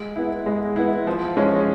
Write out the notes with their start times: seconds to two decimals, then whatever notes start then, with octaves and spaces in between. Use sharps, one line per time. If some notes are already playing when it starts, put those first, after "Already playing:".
Already playing: G#3
0.16 B3 E4
0.46 G#3
0.76 B3 E4
1.07 F3
1.37 G#3 C#4